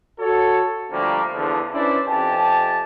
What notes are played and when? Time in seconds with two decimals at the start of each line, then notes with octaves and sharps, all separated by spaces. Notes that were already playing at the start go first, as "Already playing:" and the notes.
0.20 F#4 A4 C#5
0.91 D3 F3 G3 A3 A#3
1.34 E2 D3 F3
1.73 C#4 D4 E4 B4 C5 D5
2.07 F2 C3 G4 G#5 A5